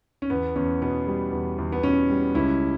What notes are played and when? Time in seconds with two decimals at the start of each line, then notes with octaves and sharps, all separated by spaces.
0.22 C#4
0.30 E2 B3
0.55 E2 C#4
0.82 B2 B3
1.07 G3
1.32 E2
1.58 E2
1.72 B3
1.83 B2 C#4
2.10 G3
2.35 C#2 C#4 E4